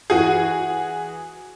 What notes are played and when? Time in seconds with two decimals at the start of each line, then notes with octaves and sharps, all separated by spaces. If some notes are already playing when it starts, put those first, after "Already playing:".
0.10 E3 F#4 G#4